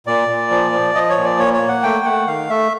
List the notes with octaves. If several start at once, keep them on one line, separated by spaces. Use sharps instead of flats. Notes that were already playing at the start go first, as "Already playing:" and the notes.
A#2 D5
A#2
F3
F3
F3 D#5
C#5
A#2
D5
A#3 C#5
C#5
A#3
F#5
A3 G5
A3 F#5
D#3 F5
A3 E5